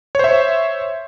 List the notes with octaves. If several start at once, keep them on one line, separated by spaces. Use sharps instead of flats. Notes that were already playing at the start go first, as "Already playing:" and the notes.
C5 C#5 E5